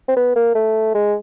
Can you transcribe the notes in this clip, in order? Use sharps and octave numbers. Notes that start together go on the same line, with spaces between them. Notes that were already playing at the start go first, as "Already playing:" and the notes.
C4
B3
A#3
A3
G#3